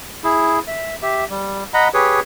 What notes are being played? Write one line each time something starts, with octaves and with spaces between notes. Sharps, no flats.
E4 G#4
E5
G4 E5
G3
D#5 F#5 A#5 B5
G4 G#4 B4 C#5